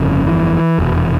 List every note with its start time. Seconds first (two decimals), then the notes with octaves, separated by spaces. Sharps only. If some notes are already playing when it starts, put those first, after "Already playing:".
Already playing: G1 F2 C#3
0.27 E3
0.79 F1 E2 B2